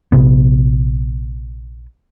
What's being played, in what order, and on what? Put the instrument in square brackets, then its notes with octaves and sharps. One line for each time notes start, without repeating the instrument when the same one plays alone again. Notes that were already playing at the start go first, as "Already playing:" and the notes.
[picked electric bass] A#1 C3 B3